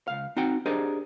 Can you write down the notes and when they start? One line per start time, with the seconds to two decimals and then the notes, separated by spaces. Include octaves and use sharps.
0.08 C#2 F5
0.37 C4 D#4 F#4 F#5 G5
0.66 D4 G4 G#4 A#4 C5 D#5